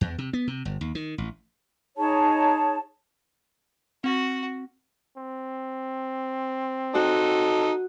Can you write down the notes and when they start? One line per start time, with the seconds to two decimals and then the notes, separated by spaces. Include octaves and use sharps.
0.01 E2
0.18 C3
0.33 B3
0.47 C3
0.65 G1
0.81 D#2
0.95 D#3
1.18 A1
1.97 D#4 G#4 C#5 A5
4.04 C4 F#4
5.17 C4
6.95 D#4 F#4 A4